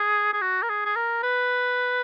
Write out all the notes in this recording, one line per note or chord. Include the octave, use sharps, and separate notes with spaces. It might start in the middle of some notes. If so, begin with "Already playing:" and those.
Already playing: G#4
G#4
F#4
A#4
G#4
G#4
A#4
B4